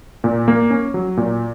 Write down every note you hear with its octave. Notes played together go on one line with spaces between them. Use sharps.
A#2
A#3
C#4
F#3
A#2